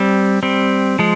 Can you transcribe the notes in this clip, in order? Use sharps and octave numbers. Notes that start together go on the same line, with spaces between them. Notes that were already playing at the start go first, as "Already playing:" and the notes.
Already playing: G3 C4
G3 C4
F3 G#3